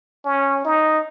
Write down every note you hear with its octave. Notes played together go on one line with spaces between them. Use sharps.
C#4
D#4